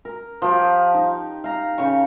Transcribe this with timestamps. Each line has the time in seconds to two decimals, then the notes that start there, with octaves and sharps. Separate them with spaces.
0.05 A#4
0.42 F3 G4
0.94 D#4
1.44 F5 A#5
1.78 C#3 G4 C#5 C#6